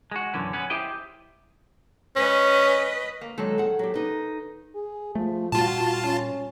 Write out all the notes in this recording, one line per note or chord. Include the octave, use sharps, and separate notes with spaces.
G#3 F#4
B1 F#2 D3 E3 C#4
B3 C#4 B4
E4 G4 C5 D#5 E5 G5
C#4 B4 D#5
A#3
D#3 F#3 G#3 A4
G#4 F#5
F#3 G4
D#4 B4
G#4
F3 A3
A#2 G3 F4 F#4 A5
C#4